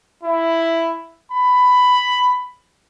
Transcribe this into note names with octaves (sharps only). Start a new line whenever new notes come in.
E4
B5